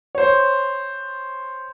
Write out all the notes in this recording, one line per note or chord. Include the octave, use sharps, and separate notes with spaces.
C5 C#5